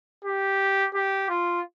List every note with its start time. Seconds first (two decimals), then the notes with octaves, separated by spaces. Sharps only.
0.24 G4
0.94 G4
1.29 F4